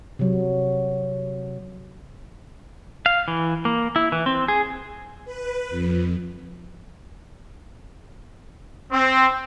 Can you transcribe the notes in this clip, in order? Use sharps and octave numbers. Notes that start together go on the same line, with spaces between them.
C3 F#3
F5
E3
A#3
E4
E3
C4
G#4
B4
F2
C4